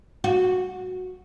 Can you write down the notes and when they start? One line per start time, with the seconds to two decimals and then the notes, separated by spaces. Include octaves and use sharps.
0.24 F#4